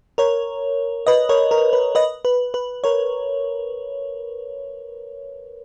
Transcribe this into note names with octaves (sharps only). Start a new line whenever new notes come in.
A#4 C#5
B4 D#5
A#4 C#5
A#4
B4
B4 D#5
B4
B4
A#4 C#5